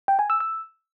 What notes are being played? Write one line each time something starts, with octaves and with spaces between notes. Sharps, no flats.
G5
G#5
E6
E6